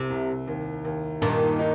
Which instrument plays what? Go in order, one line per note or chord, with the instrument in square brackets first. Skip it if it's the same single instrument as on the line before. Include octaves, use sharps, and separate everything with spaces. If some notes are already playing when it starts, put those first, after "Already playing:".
Already playing: [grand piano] C2 [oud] C3
[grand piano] C2
D#2
D#2
[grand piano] G2 [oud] A#2 D#3
[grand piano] D#4